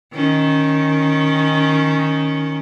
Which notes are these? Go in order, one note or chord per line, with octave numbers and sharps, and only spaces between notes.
D#3 C#4